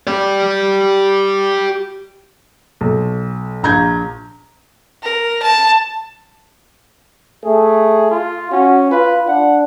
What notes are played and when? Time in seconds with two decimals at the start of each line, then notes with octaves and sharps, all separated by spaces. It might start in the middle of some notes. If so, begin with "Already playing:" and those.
0.07 G4 D5
2.81 B1
3.63 A#1 A#5 G6 G#6
5.03 A#4
5.42 A5
7.44 A3 G#4
8.11 F4
8.51 C#4 F#4
8.91 F4 B4
9.28 D4 F#5